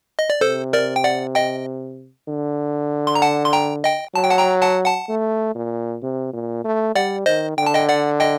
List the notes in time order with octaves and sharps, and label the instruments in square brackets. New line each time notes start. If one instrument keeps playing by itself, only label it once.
[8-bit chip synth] D#5
D5
[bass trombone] C3 [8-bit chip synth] A4 C5
[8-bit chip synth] A#4 D5
G5
D5 F#5
D#5 G5
[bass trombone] D3
[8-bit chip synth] C6
A#5
F#5 A5
C6
G5 A#5
D#5 G5
[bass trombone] F#3 [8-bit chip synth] A5
[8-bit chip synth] G5
F#5 A5
G5 A#5
F#5 A5
F#5 A5
[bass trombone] A3
A#2
C3
A#2
A3
[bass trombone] G3 [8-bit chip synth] D5 F#5
[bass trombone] D#3 [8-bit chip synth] C5 D#5
[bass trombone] D3 [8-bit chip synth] G5
[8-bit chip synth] A5
D#5 G5
D5 F#5
D#5 G5